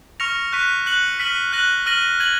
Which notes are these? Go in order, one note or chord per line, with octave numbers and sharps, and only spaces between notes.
C#6 F6 A#6 C#7 F7
C#6 F#6 B6 D#7
F#6 C#7 F#7
F6 B6 D#7 F#7
F#6 A#6 D#7 F#7
F6 A#6 D#7 F#7
G#6 D#7 F#7